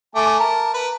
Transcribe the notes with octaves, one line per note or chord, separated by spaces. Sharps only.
A3 G#5 D6
A#4 A5
A#4 B4